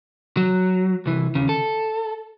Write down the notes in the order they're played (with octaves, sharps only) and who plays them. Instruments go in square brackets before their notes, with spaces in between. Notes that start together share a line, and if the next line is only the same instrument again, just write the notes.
[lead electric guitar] F#3
C2 E3
D#2 C#3
A4